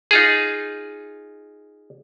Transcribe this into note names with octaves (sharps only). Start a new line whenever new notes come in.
D#4 F4 G#4